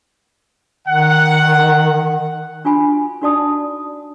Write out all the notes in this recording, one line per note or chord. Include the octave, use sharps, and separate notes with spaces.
D#3 F#5
D4 F4 F#4 G#5 B5
D4 D#4 F#4 D5 A5 D#6